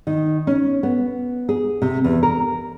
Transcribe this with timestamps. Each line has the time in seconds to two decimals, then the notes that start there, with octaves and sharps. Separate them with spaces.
0.07 D#3
0.47 C#4
0.83 B3
1.49 G#4
1.82 C3
2.04 E2
2.23 A#4